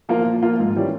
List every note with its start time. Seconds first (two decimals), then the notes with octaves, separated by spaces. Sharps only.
0.09 F3 A#3 F4
0.25 A#2
0.42 F3 A#3 F4
0.60 G#2
0.76 E3 G3 C#4